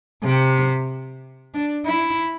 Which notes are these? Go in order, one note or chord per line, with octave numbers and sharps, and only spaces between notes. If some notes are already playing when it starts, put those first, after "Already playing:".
C3
D4
E4